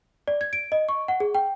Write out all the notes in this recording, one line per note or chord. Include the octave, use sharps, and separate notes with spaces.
D5
G#6
D7
D#5
C#6
F#5
G#4
G5